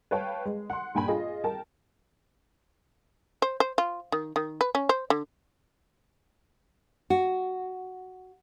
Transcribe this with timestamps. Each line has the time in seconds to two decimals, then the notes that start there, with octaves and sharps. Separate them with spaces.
0.11 B4 C#5 F5 G5 A5
0.45 G#3
0.70 F#5 C6
0.95 G2 A#2 G5 G#5 B5
1.08 F4 G#4 D#5
1.44 A#4 G5 A5
3.42 C5
3.60 C5
3.78 F4
4.12 D#3
4.36 D#3
4.61 B4
4.75 C#4
4.89 C5
5.10 D3
7.10 F#4